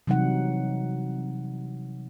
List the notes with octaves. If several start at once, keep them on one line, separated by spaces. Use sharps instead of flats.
C3 E3 F#3 G3 D#4 F#5